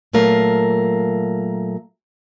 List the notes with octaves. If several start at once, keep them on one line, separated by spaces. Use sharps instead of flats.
A#2 F#3 A3 A#4 F5